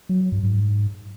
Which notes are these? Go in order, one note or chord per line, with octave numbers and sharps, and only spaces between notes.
F#3
F#3
G2
G#2